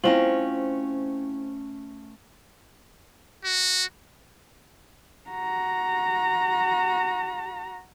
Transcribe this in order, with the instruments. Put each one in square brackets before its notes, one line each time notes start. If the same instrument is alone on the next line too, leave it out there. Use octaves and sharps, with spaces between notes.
[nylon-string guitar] A3 C#4 D#5 [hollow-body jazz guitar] C4 F4 [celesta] E4 C5 F#7
[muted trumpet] F#4
[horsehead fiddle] F#4 A#5